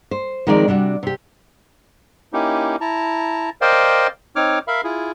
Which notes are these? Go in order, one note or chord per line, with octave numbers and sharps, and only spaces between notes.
C5
D#3 F3 G#3 C4 A#4 D5
C3 G3 D4 F#4
C3 G4
A#3 C#4 D#4 E4 G4
E4 A5 A#5
A#4 C5 D5 D#5 F5 G5
C4 D#4 C#5 D6 F6
A#4 E5 F5 B5
E4 F4 G#4